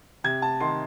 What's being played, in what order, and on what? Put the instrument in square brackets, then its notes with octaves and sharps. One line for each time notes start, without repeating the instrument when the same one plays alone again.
[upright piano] C3 G#6
A5
D#3 C6